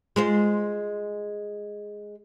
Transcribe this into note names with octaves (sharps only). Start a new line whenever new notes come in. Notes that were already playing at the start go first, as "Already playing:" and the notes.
G#3 F4 C5